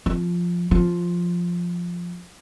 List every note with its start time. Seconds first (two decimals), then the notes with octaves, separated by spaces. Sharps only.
0.06 F3
0.71 F3